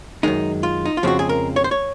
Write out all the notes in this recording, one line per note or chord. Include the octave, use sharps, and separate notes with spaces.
F#2 D#3 G#3 D#4
F4
D#4
F4
F2 C#3 F3 G#3 C4 F#4
G#4
A#4
C#5
C5
C#5